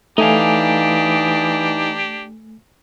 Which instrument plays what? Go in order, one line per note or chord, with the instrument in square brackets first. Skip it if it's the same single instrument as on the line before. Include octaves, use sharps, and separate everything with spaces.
[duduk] E3 [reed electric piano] A3 G#5 [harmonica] D4 G4 [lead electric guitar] D#4 F5